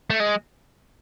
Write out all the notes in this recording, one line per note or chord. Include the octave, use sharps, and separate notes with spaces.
A3
G#3